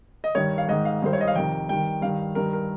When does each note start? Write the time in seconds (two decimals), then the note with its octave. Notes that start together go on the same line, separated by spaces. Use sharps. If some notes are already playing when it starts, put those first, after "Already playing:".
0.24 D#5
0.35 G2 D#3 C#5
0.58 F5
0.68 G#2 D#3 D#5
0.85 F5
1.02 G2 D#3 C5
1.13 C#5
1.21 D#5
1.28 F5
1.35 F2 C3 D#3 G5
1.69 G2 D#3 G5
2.02 G2 D#3 F5
2.35 G2 D#3 A#4
2.53 A#4